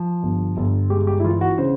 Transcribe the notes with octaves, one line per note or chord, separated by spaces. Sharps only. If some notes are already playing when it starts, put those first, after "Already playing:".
Already playing: F3
G1
G1
G#3 G4
G4
E4
E3 F4
F#4
C#3 C5